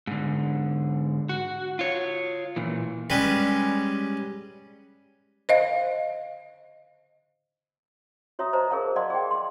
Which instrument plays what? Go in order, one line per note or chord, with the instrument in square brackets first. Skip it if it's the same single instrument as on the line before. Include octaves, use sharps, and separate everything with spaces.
[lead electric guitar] G#2 D3
F#4
F4 C#5
A#2 E3
[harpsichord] G3 G#3 C#4 B4
[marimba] C5 D#5 F5
[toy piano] F#4 C#5 E5 A#5 D#6
C5 D#5 A5 A#5
G#4 A#4 C#5 F5 A5
D5 D#5 F5 F#5 A5 C6
G#4 G5
C6